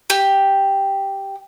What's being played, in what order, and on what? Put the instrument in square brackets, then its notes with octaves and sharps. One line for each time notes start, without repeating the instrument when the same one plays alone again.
[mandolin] G4